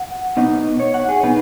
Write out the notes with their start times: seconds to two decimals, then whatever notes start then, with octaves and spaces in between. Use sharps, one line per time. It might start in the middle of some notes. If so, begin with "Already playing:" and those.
Already playing: F#5
0.37 B2 B3 D#4 D#5
0.80 C#5
0.94 F#5
1.09 G#4
1.23 B2 B3 D#4 B4